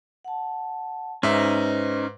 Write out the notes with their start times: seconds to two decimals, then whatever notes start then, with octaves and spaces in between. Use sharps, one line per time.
0.25 F#5 A5
1.23 G#2 C#4 D#4 B4 C5 E5